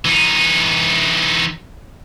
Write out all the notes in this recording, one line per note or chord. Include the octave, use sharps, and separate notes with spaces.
E3 D#4